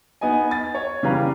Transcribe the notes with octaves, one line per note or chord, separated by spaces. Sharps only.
B3 D#4 D#5 G#5
A6
C#5
C#3 E3 G3 B4 F5 A#5